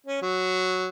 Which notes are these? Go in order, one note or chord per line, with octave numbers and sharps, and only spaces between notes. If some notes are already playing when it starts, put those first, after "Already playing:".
C#4
F#3